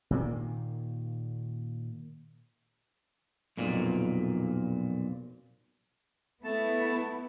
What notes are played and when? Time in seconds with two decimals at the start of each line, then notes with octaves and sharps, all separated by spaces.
0.11 A#2 D#3 A#3
3.57 B1 F2 A#2
6.44 A3 B3 E4 A5